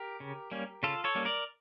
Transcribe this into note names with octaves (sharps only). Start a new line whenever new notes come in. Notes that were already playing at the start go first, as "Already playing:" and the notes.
Already playing: G4 A#4
C#3
G3 A#3 C#4
C#3 F4 A4
A4 C#5
G3 A#3 C#4
A#4 D5